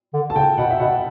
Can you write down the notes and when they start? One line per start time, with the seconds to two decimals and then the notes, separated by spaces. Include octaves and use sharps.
0.13 D3
0.30 A5
0.35 C#3 G5
0.58 B2 F#5
0.71 E5
0.80 B2 F#5